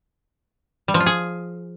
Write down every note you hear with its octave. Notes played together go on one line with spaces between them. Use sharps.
G3
F3
F4
G#4